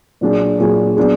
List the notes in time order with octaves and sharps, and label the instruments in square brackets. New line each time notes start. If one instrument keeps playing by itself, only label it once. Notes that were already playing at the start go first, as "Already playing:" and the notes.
[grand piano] A#2 F#3 D4 G#4
A#2 F#3 D4 G#4
F#3 B3 D4 G#4